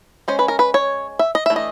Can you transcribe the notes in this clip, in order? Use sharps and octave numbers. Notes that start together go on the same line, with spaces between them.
G#3 C#4 C5
B4
A#4
B4
C#5
E5
D#5
E3 A3 D4 E5
D#5